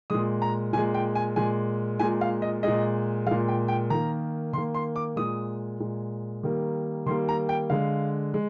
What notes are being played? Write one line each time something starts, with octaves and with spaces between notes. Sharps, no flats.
A#2 G#3 D#6
A#5
A#2 G#3 G#5
G5
G#5
A#2 G#3 G#5
A#2 G#3 G#5
F5
D#5
A#2 G#3 D#5
A#2 G#3 F5
G5
G5
D#3 A#3 A#5
D#3 A#3 C6
C6
D6
A#2 G#3 D#6
A#2 G#3
D#3 G3 A#3
D#3 G3 A#3 C6
A#5
G5
D3 G#3 F5
G#3